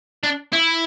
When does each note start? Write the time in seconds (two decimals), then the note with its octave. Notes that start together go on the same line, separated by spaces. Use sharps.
0.23 D4
0.53 E4